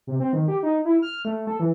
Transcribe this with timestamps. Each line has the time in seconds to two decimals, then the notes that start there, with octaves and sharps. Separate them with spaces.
0.07 C3
0.20 C4
0.33 D#3
0.48 G4
0.63 D#4
0.85 E4
1.02 F6
1.25 A3
1.47 A4
1.60 E3